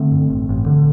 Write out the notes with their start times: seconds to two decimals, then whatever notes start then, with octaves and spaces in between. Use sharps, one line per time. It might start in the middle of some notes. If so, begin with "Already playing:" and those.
Already playing: D3 A3 C4
0.12 G2
0.30 A1
0.49 A1
0.66 D3